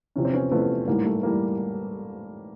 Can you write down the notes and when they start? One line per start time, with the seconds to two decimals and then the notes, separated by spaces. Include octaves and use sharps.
0.16 E2 C3 F3 C#4
0.25 C4
0.33 B3 C#4
0.51 E2 C3 F3 A3 B3
0.87 A1 G#2 E3 G3 A#3
1.05 A3
1.23 E3 G3 A#3